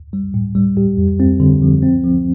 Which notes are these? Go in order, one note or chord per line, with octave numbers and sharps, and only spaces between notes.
G3
A2
G3
G4
F2
C4
D3
F3
C4
F3